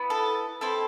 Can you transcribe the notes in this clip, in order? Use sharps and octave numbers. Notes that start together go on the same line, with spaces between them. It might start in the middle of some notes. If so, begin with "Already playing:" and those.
Already playing: B3 E4
A4
C4 E4 A4